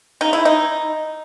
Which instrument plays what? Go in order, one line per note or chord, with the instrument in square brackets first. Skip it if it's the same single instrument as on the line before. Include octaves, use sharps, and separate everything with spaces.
[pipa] C#3 D#4
E4
D#4